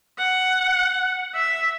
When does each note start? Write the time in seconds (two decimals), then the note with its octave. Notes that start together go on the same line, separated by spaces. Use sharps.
0.18 F#5
1.35 E5